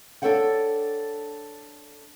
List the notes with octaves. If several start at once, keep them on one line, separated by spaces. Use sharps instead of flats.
D4 E4 A4 C#5 F#5 G5